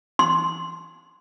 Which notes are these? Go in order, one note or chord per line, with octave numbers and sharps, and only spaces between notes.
C6